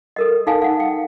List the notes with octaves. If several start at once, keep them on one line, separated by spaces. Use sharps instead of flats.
A4 A#4 D#5
D#4 A4 F5 G#5 A5
F5 F#5
G5